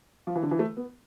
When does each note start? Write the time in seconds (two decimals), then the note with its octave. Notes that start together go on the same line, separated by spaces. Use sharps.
0.27 F3
0.36 E3
0.43 D3
0.51 E3
0.59 A3
0.77 B3